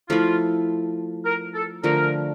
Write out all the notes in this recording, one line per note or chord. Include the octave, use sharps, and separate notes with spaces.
F3 A3 E4 F4
A#4
A4
D3 F3 A3 A#4